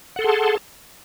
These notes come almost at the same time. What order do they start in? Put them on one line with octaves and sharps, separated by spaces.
F#5 A4 C6 G#4 A5